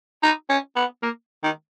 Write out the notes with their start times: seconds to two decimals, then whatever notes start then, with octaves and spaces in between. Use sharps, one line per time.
0.23 D#4
0.50 C#4
0.76 B3
1.03 A#3
1.43 D#3